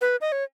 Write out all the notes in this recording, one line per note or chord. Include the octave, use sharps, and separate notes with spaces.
B4
D#5
C#5